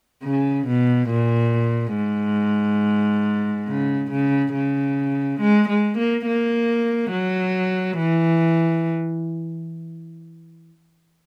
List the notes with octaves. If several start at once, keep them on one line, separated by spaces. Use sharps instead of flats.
C#3
B2
A#2
G#2
C#3
C#3
C#3
G#3
G#3
A#3
A#3
F#3
E3